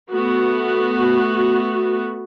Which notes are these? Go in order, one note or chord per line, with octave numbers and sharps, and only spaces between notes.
A3 B3 F#4